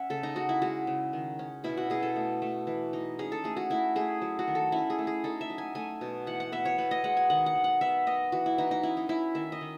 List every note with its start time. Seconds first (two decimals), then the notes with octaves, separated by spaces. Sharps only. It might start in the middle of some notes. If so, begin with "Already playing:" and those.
Already playing: C#4 E5 F#5
0.10 C#3 A4
0.23 D#4
0.36 C#3 F#4
0.49 E4
0.62 G#3 F#4
0.87 C#3
1.13 D#3
1.39 C#4
1.64 B2 E4
1.77 F#4
1.90 B2 G#4
2.02 A4
2.16 A3
2.42 A3
2.67 E3
2.93 D#4
3.19 C#4 G#4
3.32 A4
3.44 A3 G#4
3.57 F#4
3.70 A3 E4
3.95 A3 G#4
4.21 F#3
4.39 F#4
4.47 D#3
4.55 A4
4.72 C#4 E4
4.90 G#4
4.99 A3
5.07 G#4
5.24 D#4 A4
5.41 E5
5.50 F#3
5.58 G#5
5.75 A3 G#5
6.01 B2
6.27 E3 F#5
6.40 F#5
6.52 B3 E5
6.65 C#5
6.78 B2 B4
6.91 D#5
7.04 G#3 F#5
7.17 G#5
7.30 D#3 F#5
7.46 F#5
7.56 D#3
7.64 F#5
7.81 B3 E5
8.07 B3 D#5
8.32 E3 F#4
8.46 E4
8.58 E3 D#4
8.71 D#4
8.83 C#4 E4
8.97 D#4
9.09 C#4 E4
9.35 D#3 E5
9.52 D#5
9.61 D#3